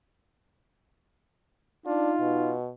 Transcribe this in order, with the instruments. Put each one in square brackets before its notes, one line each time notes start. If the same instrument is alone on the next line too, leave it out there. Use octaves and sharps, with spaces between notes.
[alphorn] D4 [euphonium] D#4 [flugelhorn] F4
[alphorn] B2